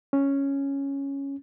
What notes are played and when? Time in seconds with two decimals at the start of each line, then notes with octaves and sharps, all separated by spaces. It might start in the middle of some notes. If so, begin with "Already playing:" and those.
0.13 C#4